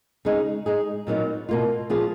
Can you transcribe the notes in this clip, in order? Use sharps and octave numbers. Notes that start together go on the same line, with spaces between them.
C#3 G#3 D#4 G#4
G#3 D#4 G#4
A#2 F#3 B3 D#4 A#4
B2 A#3 F4
A#2 F3 B3 F4 G#4